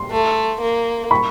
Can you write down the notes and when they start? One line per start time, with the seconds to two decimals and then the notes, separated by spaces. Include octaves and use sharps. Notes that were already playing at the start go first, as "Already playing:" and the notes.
Already playing: C6
0.11 A3
0.61 A#3
1.11 B5 C#6